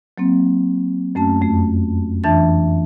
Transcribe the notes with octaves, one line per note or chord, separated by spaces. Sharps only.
F#3 A#3 C4
F#2 A3 C#4 A5
F2 A3
F2 E3 D4 E5 A5 A6